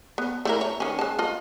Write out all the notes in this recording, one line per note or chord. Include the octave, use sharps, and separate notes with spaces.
B3
A3 E4 A#4
C#5
D#3 C#4
G#3 A5
F4 D#5